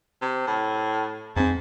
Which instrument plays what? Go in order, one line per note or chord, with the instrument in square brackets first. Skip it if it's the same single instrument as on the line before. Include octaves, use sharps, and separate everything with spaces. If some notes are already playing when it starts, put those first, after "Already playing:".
[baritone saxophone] C3
A2
[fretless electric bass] F2 C4 [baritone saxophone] G#2